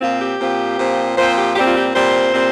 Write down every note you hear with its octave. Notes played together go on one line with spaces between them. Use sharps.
A#2 F3 C4 F4
G4
A#2 F3 C4
A#2 F3 C4
A#2 F3 C4 C5
G4
A#2 G3 C4 G4
F4
G4
A#2 G3 C4 C5
A#2 G3 C4